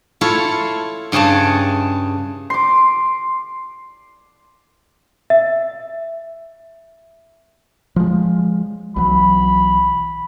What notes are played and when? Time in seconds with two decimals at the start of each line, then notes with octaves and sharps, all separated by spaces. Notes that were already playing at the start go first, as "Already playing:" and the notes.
0.21 E4 F4 A4 C#5 F5
1.12 G2 C#3 G#4 C#5 A5
2.50 C6 D6
5.30 E5
7.96 F3 G#3
8.96 B1 E3 F#3 B5